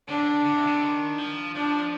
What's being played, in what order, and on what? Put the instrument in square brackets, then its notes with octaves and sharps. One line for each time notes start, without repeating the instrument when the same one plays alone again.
[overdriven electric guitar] D3 [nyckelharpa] D4
[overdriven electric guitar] D3
C3
D3
D#3
F3
[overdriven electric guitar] F3 [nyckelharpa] D4